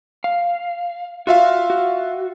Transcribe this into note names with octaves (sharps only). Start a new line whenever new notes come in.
F5
F4 F#4 E5 F5
F#4